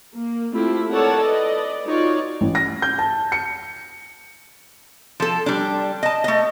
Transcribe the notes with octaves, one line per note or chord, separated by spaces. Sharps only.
A#3
A3 C4 E4 F4 G4
A4 A#4 C#5 D5 F#5 A5
B4 D5 D#5
D#4 F4 F#4 C#5 D5
A1
A#6
G6
A5
C#7
F3 A4
G3 D4
D#5 A5
A3 D#5